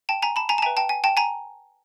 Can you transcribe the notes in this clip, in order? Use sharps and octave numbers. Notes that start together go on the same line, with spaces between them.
G5 A5
G#5 A#5
A5 B5
G#5 A#5
A5
B4 E5 G5 G#5 A#5
G5 A5
G#5
G5 A5
G#5 A#5